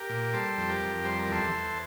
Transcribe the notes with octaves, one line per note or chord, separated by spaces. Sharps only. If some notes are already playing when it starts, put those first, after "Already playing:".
Already playing: G4 A#4
A#2
G3 A4 C5
F2
G4 A#4
F2
G3 C5
A#4
E2 A4 C5
E2